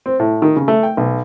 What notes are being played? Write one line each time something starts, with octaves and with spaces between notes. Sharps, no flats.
C4
A2
D#3
C#3
A3
G5
B1